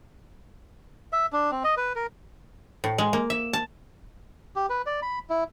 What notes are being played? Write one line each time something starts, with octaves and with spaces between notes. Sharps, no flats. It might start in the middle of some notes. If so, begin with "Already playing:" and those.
E5
D4
C4
D#5
B4
A#4
A2
G#3
A#3
E5
A5
G4
B4
D5
B5
E4